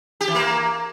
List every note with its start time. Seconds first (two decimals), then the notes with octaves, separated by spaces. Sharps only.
0.21 G4
0.28 E3
0.35 A#3